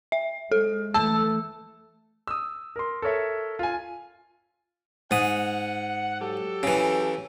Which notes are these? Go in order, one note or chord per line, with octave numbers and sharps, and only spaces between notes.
E5
G#3 A4
E3 A3 A5 E6
D#6 E6
A#4 C6
A4 A#4 C#5 E5
F4 G#5
G#2 F#5 D#6
F#3 G4 A4
C#3 E3